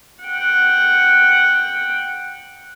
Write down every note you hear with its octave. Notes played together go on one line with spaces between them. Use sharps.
F#5 G5